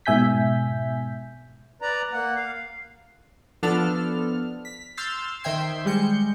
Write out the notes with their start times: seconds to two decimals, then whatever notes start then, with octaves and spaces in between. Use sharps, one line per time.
0.06 G#2 B2 E5 G#5 G6 B6
1.82 B4 D5 A#5
2.13 A#3 F#5
2.36 F5
3.63 F3 B3 D4 A4 F6
4.65 B6
4.97 C6 E6 F6 G6 A6 C7
5.44 D#3 C5 E5 G5 G#6 C7
5.85 G3 G#3 G6 C#7